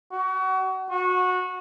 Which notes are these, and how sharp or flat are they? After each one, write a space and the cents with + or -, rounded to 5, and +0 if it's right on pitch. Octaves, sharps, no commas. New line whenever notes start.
F#4 +30
F#4 -20